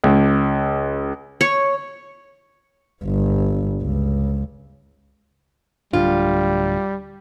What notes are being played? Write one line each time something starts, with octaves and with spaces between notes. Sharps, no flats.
C#2
C#5
G1
C#2
D1 D3 G3 F4